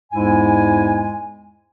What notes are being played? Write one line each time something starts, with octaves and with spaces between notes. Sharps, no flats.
E2 G#2 G#3 E4 G#5